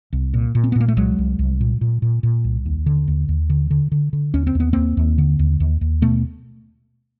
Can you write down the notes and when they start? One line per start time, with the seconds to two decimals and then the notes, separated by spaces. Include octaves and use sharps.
0.13 C2
0.34 A#2
0.55 A#2
0.64 C4
0.72 B3
0.75 A#2 A#3
0.88 A3
0.97 C2 F#3 G#3
1.18 C2
1.39 C2
1.60 A#2
1.81 A#2
2.02 A#2
2.23 A#2
2.44 C2
2.66 D#2
2.86 D3
3.08 D#2
3.29 D#2
3.50 D3
3.71 D3
3.92 D3
4.13 D3
4.34 D#2 C#4
4.47 C4
4.55 D#2
4.60 B3
4.73 D#2 A#3 C4
4.97 D#2
5.18 D3
5.39 D#2
5.60 D#2
5.81 D#2
6.02 B2 A3 B3